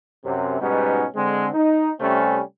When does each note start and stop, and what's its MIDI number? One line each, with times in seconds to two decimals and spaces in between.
0.24 0.61 42
0.24 0.61 48
0.61 1.05 44
0.61 1.05 47
0.61 1.05 55
0.61 1.05 59
0.61 1.05 61
0.61 1.05 63
1.15 1.49 50
1.15 1.49 56
1.15 1.49 60
1.54 1.91 63
2.00 2.40 48
2.00 2.40 55
2.00 2.40 57
2.00 2.40 60
2.00 2.40 61